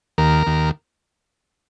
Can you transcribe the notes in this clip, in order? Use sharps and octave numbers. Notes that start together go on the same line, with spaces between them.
D#2 A#4
D#2